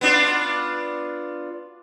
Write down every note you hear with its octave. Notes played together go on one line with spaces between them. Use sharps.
B3 D4 F4